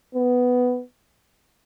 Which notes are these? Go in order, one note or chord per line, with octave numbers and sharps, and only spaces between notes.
B3